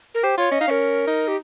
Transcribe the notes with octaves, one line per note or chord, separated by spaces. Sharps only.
A#4
G4 C5
F4 C#5
C#4 D#5
D#4 F5
C#4 A#4
D#4
G4